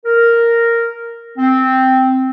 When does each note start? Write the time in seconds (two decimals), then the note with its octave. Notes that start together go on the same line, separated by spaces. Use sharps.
0.06 A#4
1.38 C4